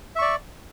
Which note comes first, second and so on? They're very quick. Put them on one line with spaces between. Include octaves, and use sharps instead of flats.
E5 C#6 D5